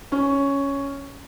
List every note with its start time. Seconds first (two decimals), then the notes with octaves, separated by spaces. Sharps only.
0.12 C#4